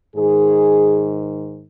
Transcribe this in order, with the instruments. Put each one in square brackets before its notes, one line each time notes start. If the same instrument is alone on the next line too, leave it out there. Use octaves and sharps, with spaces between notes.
[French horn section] G#2 D#3 G#4